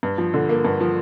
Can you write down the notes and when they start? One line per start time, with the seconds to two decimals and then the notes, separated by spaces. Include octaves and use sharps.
0.03 G2
0.18 F3
0.34 D3
0.49 A#3
0.65 G2
0.80 F3